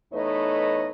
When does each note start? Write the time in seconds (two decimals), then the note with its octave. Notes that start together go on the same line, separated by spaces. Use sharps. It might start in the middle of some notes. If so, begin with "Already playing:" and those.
0.13 E2 A3 D#4 B4 C#5 D#5